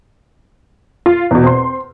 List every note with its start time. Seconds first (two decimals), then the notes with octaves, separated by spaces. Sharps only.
1.06 F4
1.31 E2 B2
1.43 C4 C6